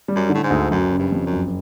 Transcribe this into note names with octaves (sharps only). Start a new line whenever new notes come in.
G3
F#2
D3
A2
G#2
D2
F#1 F#2
C#3
G2
F2
F#2
F#1